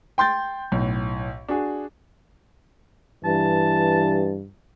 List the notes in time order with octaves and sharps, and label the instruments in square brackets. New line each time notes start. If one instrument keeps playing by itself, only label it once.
[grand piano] G5 C6 G6 A6
B1 A2
D4 F#4 G#4
[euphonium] G2 [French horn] E3 [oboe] A5